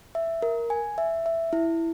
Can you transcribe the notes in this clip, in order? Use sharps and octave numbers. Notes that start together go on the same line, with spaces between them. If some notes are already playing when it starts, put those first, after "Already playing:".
E5
A#4
G#5
E5
E5
E4